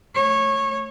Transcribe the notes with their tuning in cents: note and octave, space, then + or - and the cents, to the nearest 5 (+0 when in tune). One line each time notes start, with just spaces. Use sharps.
A3 +0 C#5 -15